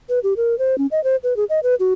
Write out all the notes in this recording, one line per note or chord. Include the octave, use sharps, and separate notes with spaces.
B4
G4
A#4
C5
C#4
D#5
C5
B4
G#4
D#5
B4
F#4